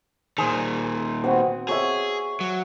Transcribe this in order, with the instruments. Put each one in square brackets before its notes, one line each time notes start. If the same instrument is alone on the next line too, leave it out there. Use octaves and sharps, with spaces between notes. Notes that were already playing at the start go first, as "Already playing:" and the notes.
[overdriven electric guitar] A#2 D#3 [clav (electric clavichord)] G#4 C5
[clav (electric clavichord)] B3 F#4 [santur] C4 F#5 D#6
[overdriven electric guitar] G#4 [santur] C#5 E5 F#5
[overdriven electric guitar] F#3